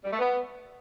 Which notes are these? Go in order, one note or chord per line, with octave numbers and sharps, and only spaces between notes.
G3
A3
B3